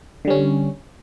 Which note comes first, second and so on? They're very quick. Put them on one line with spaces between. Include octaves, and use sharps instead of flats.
D3 G3 C#4